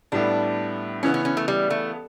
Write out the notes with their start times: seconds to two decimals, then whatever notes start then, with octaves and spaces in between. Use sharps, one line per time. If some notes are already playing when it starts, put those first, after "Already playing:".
0.12 A2 G3 B3 D4 E4 A4
1.03 C#3 E3 B3 C#4 E4
1.14 C#4
1.25 C#4
1.37 A3
1.48 G3
1.70 A3